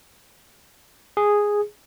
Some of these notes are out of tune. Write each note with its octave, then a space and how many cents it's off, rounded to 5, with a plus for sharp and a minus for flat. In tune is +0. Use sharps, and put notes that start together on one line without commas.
G#4 -5